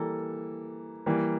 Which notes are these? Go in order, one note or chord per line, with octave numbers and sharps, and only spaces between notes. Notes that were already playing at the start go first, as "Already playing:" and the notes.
Already playing: E3 G3 A#3 A4
E3 G3 A#3